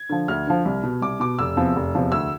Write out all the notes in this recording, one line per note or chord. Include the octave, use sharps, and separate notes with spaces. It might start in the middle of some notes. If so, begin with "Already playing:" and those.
Already playing: G#6
D3 F3
D2 F6
D3 F3
C2
B2
C2 D6
B2 D6
F1 E6
E2 C3 F3
F1
E2 C3 F3
D2 E6